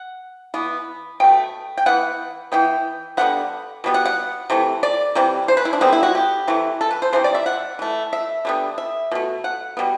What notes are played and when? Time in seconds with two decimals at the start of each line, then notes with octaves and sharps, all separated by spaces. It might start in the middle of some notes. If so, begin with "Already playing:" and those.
Already playing: F#5
0.54 E3 B3
1.20 B2 A3 G5
1.77 G5
1.86 E3 B3 F#5
2.52 E3 B3 G5
3.17 D3 G3 B3 F#5
3.84 B2 G3 B3
3.94 F#5
4.06 F#5
4.50 C3 E3 A3
4.83 D5
5.15 C3 E3 G3
5.48 C5
5.57 B4
5.65 E4
5.73 D4
5.81 D3 G3 B3 C4
5.93 E4
6.03 F#4
6.15 G4
6.47 C3 E3 A3
6.81 A4
6.91 B4
7.02 C5
7.13 C3 E3 A3 C5
7.24 D5
7.35 E5
7.46 F#5
7.79 E3 A3
8.13 E5
8.45 D3 G3 B3
8.78 E5
9.11 B2 A3
9.44 F#5
9.77 B2 G3 B3